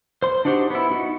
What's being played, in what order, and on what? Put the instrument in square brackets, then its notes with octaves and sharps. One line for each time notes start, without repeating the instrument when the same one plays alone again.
[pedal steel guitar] C5 C6
D4 D#4 F#4 G4 C5
B3 E4
D#4 F#4